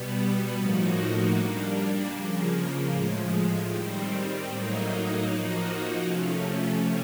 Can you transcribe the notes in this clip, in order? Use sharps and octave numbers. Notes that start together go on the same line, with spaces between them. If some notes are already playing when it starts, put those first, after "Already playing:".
Already playing: B2 G3 B3
A2 F3 A#3 D#4 F#4
G3 A#3 D4
C#3 F3 A#3
A2 F3 G#3
D#3 G3 C4
A2 F#3 A#3 D#4
F3 A#3 D#4 F#4
C3 F3 A3 C#4